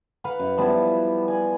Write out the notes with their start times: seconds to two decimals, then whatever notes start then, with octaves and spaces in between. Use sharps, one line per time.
0.24 B4 F5 F#5 A#5
0.40 F#2
0.57 F3 G3 B3 E4
1.28 D5 G#5